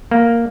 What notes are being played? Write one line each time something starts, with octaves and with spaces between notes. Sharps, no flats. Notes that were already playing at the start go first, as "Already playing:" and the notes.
A#3